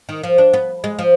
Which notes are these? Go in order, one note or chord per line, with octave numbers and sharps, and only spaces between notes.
D#3
F3
D4
B3
G#3
F3